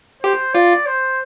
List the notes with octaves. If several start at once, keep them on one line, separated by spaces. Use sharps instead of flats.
G4 C5
F4 D5
C5